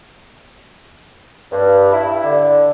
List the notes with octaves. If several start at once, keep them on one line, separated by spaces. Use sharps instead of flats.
G2
E4
D3